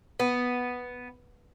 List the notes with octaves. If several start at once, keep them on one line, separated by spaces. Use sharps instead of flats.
B3